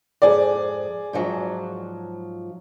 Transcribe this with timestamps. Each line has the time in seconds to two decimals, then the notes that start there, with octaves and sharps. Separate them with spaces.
0.22 F2 G#2 G#4 D5
1.13 G#2 F3 F#3